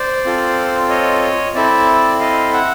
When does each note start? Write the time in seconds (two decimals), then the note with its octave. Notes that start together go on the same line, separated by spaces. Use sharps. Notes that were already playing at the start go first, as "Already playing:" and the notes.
Already playing: C5 D5
0.25 C4 F4 A4
0.89 C#5 D#5
1.55 C4 E4 A4 D5 E5
2.20 D#5 F5
2.53 E5 F#5